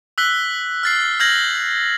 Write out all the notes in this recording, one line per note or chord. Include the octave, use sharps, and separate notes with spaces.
E6 F#6 B6 G7
F6 A6 C7
E6 F6 G6 G#6 A#6 F#7